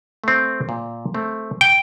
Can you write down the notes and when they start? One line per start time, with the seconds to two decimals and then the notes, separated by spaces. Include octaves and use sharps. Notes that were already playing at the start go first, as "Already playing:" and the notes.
0.24 A3 C4
0.69 A#2
1.14 A3 C4
1.61 G5